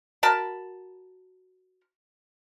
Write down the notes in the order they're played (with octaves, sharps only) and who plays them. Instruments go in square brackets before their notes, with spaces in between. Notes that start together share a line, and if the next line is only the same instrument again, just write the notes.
[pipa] F#4 A#4 A5 B5